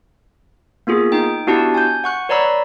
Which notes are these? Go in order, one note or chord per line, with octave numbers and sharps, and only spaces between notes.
A#3 B3 F4 G#4
D#4 G5
B3 D4 E4 F#4 G4 A5
G#5 G6
F#5 C#6 F#6
B4 C#5 D5 A#5 B5 E6